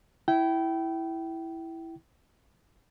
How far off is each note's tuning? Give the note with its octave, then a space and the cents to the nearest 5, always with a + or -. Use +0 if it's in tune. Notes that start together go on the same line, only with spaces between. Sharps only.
E4 +0 G5 -25